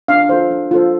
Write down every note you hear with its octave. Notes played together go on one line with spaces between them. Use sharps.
D4 F5
F4 A4 C5
D4
F4 A4 C5